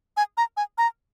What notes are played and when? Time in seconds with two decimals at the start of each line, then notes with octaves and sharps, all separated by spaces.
0.17 G#5
0.37 A#5
0.57 G#5
0.78 A#5